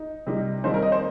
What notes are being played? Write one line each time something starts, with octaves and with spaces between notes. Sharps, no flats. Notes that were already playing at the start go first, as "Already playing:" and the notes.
Already playing: D#4
C3 G3 D#4
D#2 D#3 G3 C4 D#4 C5
A#4
D#5
C5